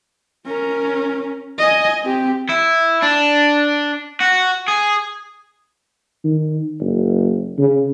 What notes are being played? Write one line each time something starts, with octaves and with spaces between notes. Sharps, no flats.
C#4 A#4
D#5 G#5
C4 G4
E4
D4
F#4
G#4
D#3
F#1
C#3